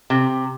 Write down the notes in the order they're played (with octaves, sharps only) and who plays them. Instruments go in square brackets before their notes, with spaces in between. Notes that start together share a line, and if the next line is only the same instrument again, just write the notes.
[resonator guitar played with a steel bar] C3